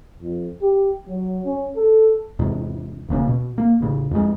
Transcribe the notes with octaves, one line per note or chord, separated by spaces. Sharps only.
F2
G4
F#3
C#4
A4
E2 G#2 C3
E1 C#3 A#3 C#4
B2
A#3
A1 C#3
F2 G#3